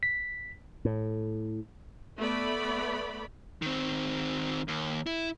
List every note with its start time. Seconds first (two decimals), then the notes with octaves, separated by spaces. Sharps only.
0.03 B6
0.85 A2
2.18 A3 B3 D5 B5
3.62 D#3 C4
4.68 D#2
5.06 E4